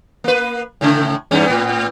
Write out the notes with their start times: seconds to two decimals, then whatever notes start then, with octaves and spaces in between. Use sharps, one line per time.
0.24 A#3 B4
0.81 A2 C#3 A3
1.31 E2 G2 C#4
1.46 A2 B3